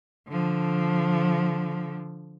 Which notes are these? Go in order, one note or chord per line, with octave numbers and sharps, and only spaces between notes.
D3 F3